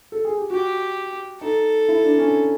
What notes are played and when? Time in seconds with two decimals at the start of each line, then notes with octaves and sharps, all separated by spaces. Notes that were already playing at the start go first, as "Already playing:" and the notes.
0.12 A4
0.25 G#4
0.38 G4
0.50 F#4 G4
1.41 D#4 A4
1.88 E4
2.04 D4
2.18 C#4